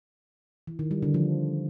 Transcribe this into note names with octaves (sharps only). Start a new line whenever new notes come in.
E3
D#3
G3
D3
F3